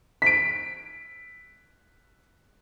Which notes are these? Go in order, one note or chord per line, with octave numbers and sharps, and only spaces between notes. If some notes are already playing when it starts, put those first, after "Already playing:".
B6 D7